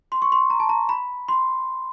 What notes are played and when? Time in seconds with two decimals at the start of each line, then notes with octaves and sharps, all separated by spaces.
0.12 C6
0.22 C#6
0.32 C6
0.50 A#5
0.60 A5
0.69 A#5
0.89 B5
1.28 C6